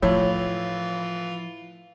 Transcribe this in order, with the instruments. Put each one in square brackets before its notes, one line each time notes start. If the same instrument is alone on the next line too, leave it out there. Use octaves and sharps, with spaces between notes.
[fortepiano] A2 [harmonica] E3 F4 [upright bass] F3 [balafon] C#5